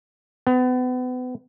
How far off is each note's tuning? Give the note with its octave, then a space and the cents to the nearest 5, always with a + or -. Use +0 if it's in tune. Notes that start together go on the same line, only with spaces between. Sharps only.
B3 +35